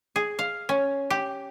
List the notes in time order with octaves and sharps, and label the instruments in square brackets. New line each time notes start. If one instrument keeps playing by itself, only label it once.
[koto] G#4
F5
C#4
G4